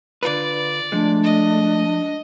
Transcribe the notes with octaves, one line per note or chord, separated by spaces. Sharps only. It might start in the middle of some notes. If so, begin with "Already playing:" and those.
D3 F4 B4 D5
F3 G#3 A3 D4
D#5